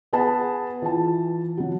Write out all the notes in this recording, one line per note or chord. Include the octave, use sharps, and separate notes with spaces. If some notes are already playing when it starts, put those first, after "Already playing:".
B3 G#4 B4 A5
E3 F4 A5
F#3 F#4